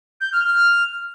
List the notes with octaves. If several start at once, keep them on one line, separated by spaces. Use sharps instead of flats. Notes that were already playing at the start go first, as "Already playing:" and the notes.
G6
F6
F6